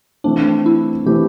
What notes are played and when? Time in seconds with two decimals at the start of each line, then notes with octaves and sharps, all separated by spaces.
0.24 E3 A3 C4 D4
0.66 E4
1.06 E3 A3 C4 G4